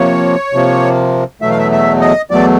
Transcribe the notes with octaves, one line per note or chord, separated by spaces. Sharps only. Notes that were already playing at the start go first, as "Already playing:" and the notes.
Already playing: C3 F3 A#3 C#5
C3 F3 A#3
E2 B2 F#3 A3 E5
F5
E5
E5
D#5
E2 B2 F#3 A3 D5